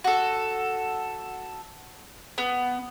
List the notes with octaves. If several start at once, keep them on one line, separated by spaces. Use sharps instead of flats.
F#4 A4
B3